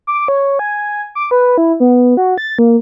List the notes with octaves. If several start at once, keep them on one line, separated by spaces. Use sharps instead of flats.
D6
C#5
G#5
D6
B4
E4
B3
F#4
A6
A#3